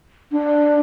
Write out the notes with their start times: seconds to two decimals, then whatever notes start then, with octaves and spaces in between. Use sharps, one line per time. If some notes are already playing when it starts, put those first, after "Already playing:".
0.32 D4